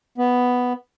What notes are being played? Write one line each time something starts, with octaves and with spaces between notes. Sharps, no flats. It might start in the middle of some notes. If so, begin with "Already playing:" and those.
B3